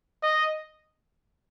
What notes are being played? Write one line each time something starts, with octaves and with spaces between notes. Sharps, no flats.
D#5